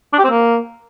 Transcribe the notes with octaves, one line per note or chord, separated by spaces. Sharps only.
D4
G4
C4
A#3